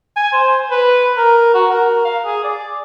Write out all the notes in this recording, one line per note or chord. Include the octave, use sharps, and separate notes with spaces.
G#5
C5
B4
A#4
F#4
A#4
F5
G#4
D5